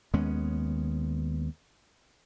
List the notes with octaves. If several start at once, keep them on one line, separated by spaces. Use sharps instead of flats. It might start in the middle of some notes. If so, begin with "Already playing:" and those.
D#2 G#3 B3 C#4